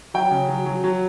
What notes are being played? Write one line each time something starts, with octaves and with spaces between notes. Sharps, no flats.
F#3 G5
C#3
F#3
F#3
F#3